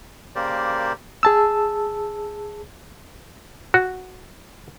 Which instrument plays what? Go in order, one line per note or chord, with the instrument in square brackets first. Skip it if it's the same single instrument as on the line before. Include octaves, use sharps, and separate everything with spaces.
[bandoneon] C#3 A#3 G4 A#4 C5 D5
[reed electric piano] G#4 A5 E6
[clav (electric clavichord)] F#4